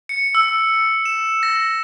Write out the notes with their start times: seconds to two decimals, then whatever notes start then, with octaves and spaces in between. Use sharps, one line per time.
0.09 C#7
0.35 E6
1.05 E7
1.43 A#6